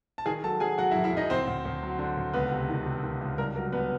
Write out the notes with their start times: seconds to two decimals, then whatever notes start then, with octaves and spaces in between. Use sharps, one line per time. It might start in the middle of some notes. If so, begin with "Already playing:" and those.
0.18 A5
0.26 D#3 G#4 G#5
0.44 F#3 A4 A5
0.60 F#3 G#4 G#5
0.78 F#3 F#4 F#5
0.91 E4 E5
0.95 F#2
1.04 E4 E5
1.13 F#2 D#4 D#5
1.30 D2 C4 C5
1.47 D2
1.65 D2
1.83 F#3
1.99 D3
2.17 D2
2.34 C#2 B3 B4
2.52 C3
2.69 D#3
2.85 C3
3.03 D#3
3.21 C#2
3.38 G2 A#4
3.55 F#3 A#4
3.72 G2 B3 B4